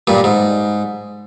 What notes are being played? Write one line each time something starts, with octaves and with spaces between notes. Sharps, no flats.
G2 A#2
G#2